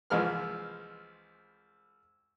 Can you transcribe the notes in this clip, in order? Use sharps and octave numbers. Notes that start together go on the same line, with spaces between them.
C2 E3 F3 G#3 B5 F6